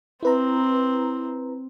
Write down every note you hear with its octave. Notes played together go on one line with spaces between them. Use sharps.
C4 E4 B4 A#5